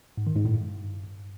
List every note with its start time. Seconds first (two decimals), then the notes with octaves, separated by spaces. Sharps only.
0.17 G#2
0.27 D#3
0.36 G#2
0.45 A2
0.54 G2